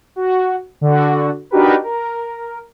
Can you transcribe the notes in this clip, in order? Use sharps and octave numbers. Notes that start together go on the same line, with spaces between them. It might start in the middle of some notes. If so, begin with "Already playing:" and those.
F#4
D3 F#4
D4 D#4 F#4 G4 A#4 B4
A#4